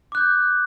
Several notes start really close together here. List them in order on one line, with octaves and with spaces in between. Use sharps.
D6 F#6 G6